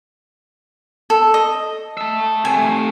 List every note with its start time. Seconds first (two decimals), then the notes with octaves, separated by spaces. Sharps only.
1.10 A4
1.34 D#5
1.97 E5 A5
2.45 C3 A3 G#5